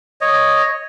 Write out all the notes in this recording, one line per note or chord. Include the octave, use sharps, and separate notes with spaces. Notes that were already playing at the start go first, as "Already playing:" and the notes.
C#5 D#5